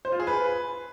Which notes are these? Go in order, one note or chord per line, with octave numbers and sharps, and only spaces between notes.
C5
F4
G#4
B4